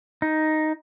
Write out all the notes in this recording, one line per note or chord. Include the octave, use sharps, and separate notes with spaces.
D#4